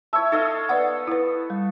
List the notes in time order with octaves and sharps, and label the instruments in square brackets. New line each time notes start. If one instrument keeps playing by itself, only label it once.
[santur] E4 C#5 E5 [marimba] A5 E6
[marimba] D#4 [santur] A4 D#5 F5
[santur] B3 [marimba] B4 D5 F#5
[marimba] E4 B4
G3